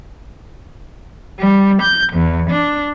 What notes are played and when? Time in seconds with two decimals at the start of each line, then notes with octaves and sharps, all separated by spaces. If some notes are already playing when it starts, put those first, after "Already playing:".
1.39 G3
1.82 G6
2.14 E2
2.51 D4